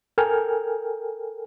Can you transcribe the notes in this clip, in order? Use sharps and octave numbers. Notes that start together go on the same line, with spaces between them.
A4 A#4 G5 G#5 F6